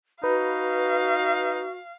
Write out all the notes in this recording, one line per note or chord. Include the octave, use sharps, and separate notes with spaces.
D#4 F#4 B4 F5